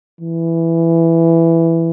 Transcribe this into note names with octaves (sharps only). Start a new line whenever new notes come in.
E3